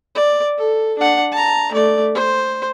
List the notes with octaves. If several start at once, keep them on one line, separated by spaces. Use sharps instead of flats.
D5
A4
D4 F#5
A5 A#5
A3 D5
C5